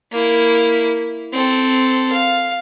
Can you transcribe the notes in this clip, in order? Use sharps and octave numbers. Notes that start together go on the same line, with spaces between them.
A#3 E4
C4 A4
F5